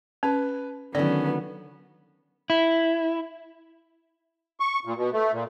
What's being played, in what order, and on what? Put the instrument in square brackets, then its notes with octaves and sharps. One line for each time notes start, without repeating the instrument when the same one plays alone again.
[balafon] C#4 [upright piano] B4
[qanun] D3 D#3 [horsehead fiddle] F#3 B3 [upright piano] C#4 [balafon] D5
[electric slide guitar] E4
[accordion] C#6
A#2
B2
A3
A#2